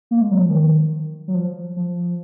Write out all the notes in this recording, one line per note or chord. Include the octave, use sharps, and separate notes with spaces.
A#3
G#3
F#3
F3
D#3
F#3
F3
F3